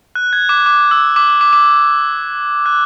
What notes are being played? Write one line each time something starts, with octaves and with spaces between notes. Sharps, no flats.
F#6
G#6
D6
D6
E6
D6
D6
D6
D6
F#6